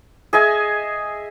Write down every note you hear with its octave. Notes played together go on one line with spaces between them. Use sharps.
G#4 D#5 E5 G#5